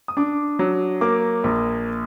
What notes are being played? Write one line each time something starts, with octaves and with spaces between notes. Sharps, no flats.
D#6
D4 D6
F#3
A#3 D6
A#1